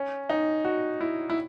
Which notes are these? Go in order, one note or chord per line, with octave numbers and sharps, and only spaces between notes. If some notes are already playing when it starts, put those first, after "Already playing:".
Already playing: C#4
D#4
F#4
E4
E4